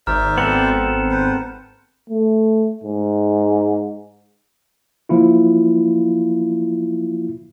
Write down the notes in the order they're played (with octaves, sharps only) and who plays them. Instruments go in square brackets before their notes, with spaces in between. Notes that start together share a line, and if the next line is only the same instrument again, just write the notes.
[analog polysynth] G#1 [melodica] C5 D5 E5 [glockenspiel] A#5 F6
[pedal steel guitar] B3 C4 A4 [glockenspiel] F#6 C#7
[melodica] B4 C5
[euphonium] A3
G#2
[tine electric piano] F3 A#3 E4 F4